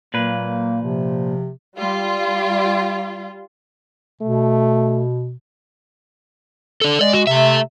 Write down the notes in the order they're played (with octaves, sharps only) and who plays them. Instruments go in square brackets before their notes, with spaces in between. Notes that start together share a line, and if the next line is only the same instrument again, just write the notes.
[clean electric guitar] A#2 B4 [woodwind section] F#3 A#3
[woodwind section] C3 F3
[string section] G3 F4
[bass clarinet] B2 [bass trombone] A3
[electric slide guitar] D4 A4
[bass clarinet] G#3 [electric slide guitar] D5
[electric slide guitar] F#4
[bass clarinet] C3 [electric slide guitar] A3 E5